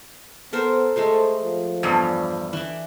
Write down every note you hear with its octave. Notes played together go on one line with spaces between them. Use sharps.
B3 A4 A#4 C5
G#3 A3 A4 C5
F3
E2 G2
E3 D4